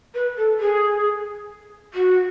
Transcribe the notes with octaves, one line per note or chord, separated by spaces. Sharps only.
B4
A4
G#4
F#4